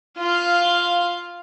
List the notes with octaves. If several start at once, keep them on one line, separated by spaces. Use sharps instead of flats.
F4 F5